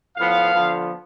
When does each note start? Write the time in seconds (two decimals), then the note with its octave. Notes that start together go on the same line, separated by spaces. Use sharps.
0.17 A2 F3 B3 F5
0.54 D3 F3 B3